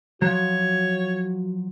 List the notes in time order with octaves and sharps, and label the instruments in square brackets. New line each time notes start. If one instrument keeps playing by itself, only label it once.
[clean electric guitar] F3 F#3 [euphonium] F#4 [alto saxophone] C#5